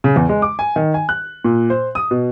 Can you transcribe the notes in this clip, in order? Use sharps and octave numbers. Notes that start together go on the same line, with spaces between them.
C#3
E2
G#3
D6
G#5
D#3
G#5
F#6
A#2
C5
D#6
B2